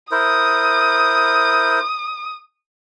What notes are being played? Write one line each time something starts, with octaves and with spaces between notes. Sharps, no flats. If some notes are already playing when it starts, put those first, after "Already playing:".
E4 A#4 C5 D#6